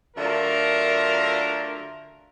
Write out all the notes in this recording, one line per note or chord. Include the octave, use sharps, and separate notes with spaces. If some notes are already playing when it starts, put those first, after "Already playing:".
D3 F#3 A3 F4 A#4